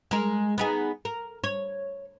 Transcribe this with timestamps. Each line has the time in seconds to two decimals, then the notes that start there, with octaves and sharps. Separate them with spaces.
0.11 G#3 A#4
0.58 B3 D#4 G#4
1.05 A#4
1.44 C#5